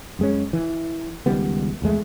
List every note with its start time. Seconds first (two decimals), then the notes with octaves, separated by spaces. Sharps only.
0.19 F#2 G#3 C#4
0.53 E3
1.26 C#2 D#3 G3 B3
1.82 F1 E2 G#3 A3